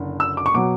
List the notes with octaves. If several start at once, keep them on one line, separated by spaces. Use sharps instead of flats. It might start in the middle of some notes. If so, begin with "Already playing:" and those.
Already playing: F#1 D3
E6
D6
C#6
B2 F#3 D6